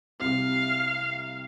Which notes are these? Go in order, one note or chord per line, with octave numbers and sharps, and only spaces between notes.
C2 C3 F5